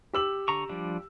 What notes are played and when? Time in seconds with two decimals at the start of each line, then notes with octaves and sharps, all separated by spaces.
0.13 G4 E6 F#7
0.48 D3 A#5 C#6
0.69 F3 G3 D4